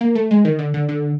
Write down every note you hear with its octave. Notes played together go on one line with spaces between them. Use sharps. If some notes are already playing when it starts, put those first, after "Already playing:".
A#3
A3
G#3
D#3
D3
D3
D3